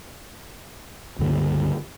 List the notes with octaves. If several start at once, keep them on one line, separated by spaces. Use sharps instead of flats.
C#2 G2 D3 A#3